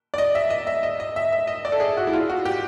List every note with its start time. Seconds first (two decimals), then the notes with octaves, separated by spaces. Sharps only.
0.14 D5
0.18 D#5
0.35 E5
0.50 D#5
0.67 E5
0.83 D#5
1.00 D#5
1.16 E5
1.32 E5
1.47 D#5
1.65 D5
1.72 A4
1.80 G#4
1.97 F#4
2.07 E4
2.13 F4
2.29 F#4
2.45 G4